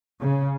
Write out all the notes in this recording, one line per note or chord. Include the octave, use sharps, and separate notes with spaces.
C#3